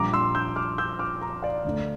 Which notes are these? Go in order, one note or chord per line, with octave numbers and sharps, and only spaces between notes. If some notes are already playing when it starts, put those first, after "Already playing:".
Already playing: A#1 A#2 G3 A#5 D6
C6 E6
E6 G6
D6 F6
E6 G6
D6 F6
A#5 D6
D5 F5
D2 D3 A3